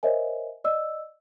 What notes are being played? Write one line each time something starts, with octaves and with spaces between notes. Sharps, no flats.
A#4 C5 C#5 D#5 E5 G#5
D5 D#5 E6